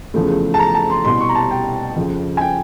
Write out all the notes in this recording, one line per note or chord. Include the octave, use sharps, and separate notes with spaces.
E2 C#3 F3 A3
A5
A#5
A5
C6
C2 B2 G3 C6
C#6
A#5
A5
G5
F2 C#3 F3
G#5
G5